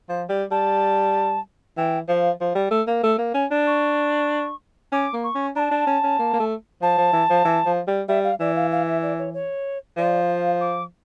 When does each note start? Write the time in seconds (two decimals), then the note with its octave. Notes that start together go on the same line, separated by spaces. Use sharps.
0.09 F3
0.29 G3
0.51 G3 A5
1.77 E3 G5
2.08 F3 F5
2.40 F3
2.55 G3
2.71 A3
2.87 A#3
3.03 A3
3.18 A#3
3.34 C#4
3.51 D4
3.67 C#6
4.92 C#4 D6
5.13 A#3
5.23 C#6
5.35 C#4
5.56 D4 A5 A#5
5.71 D4
5.87 C#4
6.03 C#4
6.19 A#3
6.33 A#3
6.40 A3
6.82 F3 A5
6.98 F3
7.13 E3
7.29 F3
7.45 E3
7.65 F3
7.87 G3
8.08 G3 E5
8.23 F5
8.40 E3 D5
8.55 F5
8.71 F5
8.86 E5
9.02 D5
9.18 C#5
9.33 C#5
9.97 F3 D5
10.29 F5
10.61 D6